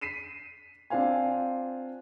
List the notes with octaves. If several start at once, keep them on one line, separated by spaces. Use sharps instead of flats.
B6 C7 D#7 E7
C4 D4 F4 C5 F5 G#5